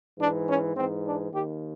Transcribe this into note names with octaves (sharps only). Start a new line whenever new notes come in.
G#2 E3 D4
C#4
G#2 E3 C4
D4
D#2 D#3 G4